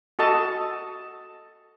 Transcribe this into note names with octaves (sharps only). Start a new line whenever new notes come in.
F#4 A4 D#5 A5